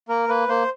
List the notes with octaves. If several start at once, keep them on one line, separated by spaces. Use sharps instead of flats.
A#3 A#4
A#3 B4
A#3 C5